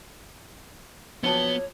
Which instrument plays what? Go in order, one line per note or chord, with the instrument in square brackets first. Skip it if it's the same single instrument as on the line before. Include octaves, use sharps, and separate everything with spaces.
[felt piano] A#1 F#3 A5 [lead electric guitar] B3 [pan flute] C#5 [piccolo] G7